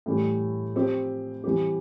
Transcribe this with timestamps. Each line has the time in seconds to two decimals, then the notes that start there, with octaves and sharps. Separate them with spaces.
0.06 A2 E3 G3
0.75 F3 C4 G4
1.44 E3 G3 C4 G4